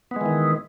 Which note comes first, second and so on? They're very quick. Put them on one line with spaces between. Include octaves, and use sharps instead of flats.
B3 G#3 E3 D#3